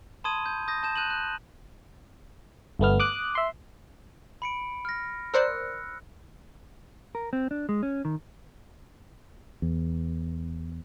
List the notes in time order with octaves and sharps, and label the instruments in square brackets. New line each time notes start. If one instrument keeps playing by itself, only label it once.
[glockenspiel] A5 B5 C6 D#6 G#6 D#7
G6
D#6 G6 A#6
A5 G6 E7
F#6 G6 D#7 E7 F#7
F#6
[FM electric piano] G1 A3 B3 F6
D6 D#6 F#6
E5 C6
[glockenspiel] B5 C#7 D7
F6 A#6
[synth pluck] A#4 C5 D5 [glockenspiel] E6 F#6 C#7
[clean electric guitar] A#4
C4
D4
G#3
C#4
D#3
[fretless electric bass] E2